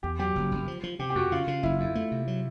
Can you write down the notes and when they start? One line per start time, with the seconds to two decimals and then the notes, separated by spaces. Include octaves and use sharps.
0.03 E2 G4
0.19 F#3 G4
0.36 F#1
0.51 F#1
0.68 F3
0.83 F3
0.99 C3 G4
1.10 G4
1.15 F2 F#4
1.32 C#3 F4
1.47 C#3
1.63 F#1 E4
1.79 F2 E4
1.95 A3
2.11 C3
2.27 F#3